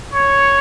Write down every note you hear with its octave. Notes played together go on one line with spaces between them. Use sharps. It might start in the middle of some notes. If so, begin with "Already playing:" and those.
C#5